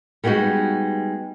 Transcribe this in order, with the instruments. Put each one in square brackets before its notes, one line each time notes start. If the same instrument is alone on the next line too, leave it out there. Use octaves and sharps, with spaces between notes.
[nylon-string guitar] G3 G#3 B3 D#4 F#4